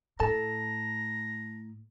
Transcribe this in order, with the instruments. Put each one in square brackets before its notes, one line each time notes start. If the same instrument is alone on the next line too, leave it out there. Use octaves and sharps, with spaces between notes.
[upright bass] A2 [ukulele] A4 [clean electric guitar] A5 [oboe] A#5